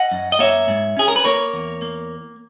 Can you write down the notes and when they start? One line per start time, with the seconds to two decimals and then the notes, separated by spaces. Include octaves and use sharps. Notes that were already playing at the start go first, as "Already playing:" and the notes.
Already playing: D#5 F#5
0.11 F#2
0.32 D#5
0.39 A#3 C#5 E5
0.68 G#2
0.97 C#4 G#4
1.08 A#4
1.16 B4
1.25 A#3 A#4 C#5
1.54 E2
1.82 A#3